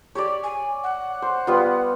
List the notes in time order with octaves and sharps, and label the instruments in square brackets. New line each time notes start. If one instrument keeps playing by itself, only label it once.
[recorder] G4 [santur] C#5 D5
[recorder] G#5
F#5
[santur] C5
G3 B3 F4